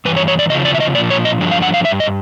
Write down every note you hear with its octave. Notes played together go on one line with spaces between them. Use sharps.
G2 E3 B4
C#5
C#5
D5
E2 C#3 F3 D#5
D5
E5
D#5
A#2 F3 D5
C#5
D#5
G2 D3 F3
F5
F#5
F5
D#3 E5
G2
D#5